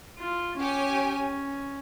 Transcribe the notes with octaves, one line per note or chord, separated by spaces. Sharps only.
F4
C#4 G4 C#5 G#5